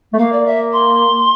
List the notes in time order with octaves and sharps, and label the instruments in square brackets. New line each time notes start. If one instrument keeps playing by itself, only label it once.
[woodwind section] A3
[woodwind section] A#3 [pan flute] F5
[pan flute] D5
E5
C6